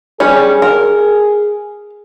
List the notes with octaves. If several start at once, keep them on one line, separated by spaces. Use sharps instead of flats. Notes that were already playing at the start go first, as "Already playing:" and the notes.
G3 C#4 G#4
A#4